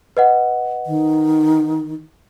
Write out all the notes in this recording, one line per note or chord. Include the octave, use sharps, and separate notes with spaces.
B4 D#5 F#5
D#3